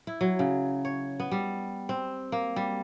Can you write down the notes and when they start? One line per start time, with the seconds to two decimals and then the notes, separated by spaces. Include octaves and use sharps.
0.07 E4
0.21 F#3
0.39 C#3
0.85 C#5
1.20 B3
1.31 G3
1.89 C4
2.32 A#3
2.56 G3